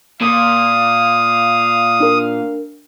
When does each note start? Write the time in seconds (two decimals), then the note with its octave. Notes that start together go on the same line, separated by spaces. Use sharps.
0.21 A#2 F5 D#6
2.00 D4 A#4